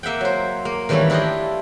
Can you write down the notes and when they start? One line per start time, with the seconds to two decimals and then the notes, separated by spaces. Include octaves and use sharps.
0.03 A#3 E5 F#5 G5
0.21 F#3 C5
0.65 A#3
0.89 D#3 E3 G3 A3 C#4 E4
1.10 D4 E4 F4 G4 D5 D#5